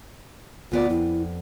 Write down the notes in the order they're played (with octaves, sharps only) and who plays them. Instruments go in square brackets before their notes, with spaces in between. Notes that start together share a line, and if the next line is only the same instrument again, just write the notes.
[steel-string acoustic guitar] D2 B3 D5 [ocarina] F4
[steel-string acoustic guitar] F2 [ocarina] E4